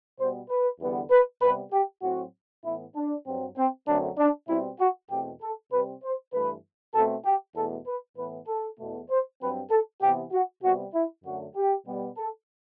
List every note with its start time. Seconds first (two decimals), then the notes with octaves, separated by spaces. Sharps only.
0.19 B2 G3 B3 C5
0.49 B4
0.80 E2 D3 G3 B3
1.11 B4
1.41 C3 G3 B3 B4
1.72 G4
2.03 A2 F#3 C4 F#4
2.64 A2 E3 B3 E4
2.96 D4
3.26 G2 F#3 C4
3.57 C4
3.88 F#2 D3 F#3 A3 C4 D4
4.18 D4
4.49 B2 G3 C4 E4
4.80 F#4
5.10 E2 B2 A3 C4 G4
5.42 A4
5.72 C3 G3 C4 B4
6.03 C5
6.33 G2 E3 A3 B4
6.94 B2 A3 C4 A4
7.25 G4
7.56 E2 B2 A3 A4
7.87 B4
8.17 A2 E3 B3 B4
8.48 A4
8.79 E2 B2 A3
9.10 C5
9.41 G2 F#3 C4 B4
9.71 A4
10.02 C3 E3 B3 G4
10.32 F#4
10.63 C3 G3 B3 F#4
10.95 E4
11.24 F#2 D3 F#3 A3 F#4
11.55 G4
11.87 B2 G3 B3
12.17 A4